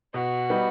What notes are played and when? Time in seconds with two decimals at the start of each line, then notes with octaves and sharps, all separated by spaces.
0.14 B2 F#4
0.50 G3 B3 D#4